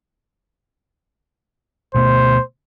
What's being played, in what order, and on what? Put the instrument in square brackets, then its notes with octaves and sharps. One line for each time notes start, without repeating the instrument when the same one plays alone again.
[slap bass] D2 B2 A3 [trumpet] C5